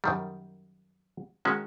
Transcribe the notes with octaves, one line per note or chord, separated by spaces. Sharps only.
F#2 D#3 G3
D#3 G#3 C#4 F#4